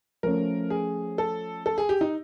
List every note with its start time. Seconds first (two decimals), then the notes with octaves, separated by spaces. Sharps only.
0.23 F3 A3 C#4 A#4
0.70 G#4
1.18 A4
1.66 A4
1.78 G#4
1.89 G4
2.01 D#4